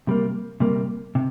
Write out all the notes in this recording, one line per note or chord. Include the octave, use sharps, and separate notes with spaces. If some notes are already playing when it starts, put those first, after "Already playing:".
C3 G3 A#3
C3 G3 A#3
C3